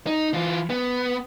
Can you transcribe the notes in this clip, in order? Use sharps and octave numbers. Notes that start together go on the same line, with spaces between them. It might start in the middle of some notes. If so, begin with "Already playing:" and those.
D#4
E3 F4
B3